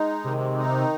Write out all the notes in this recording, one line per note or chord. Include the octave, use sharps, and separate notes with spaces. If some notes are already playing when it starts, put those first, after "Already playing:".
Already playing: G#3 D#4
C3 D#3
D#4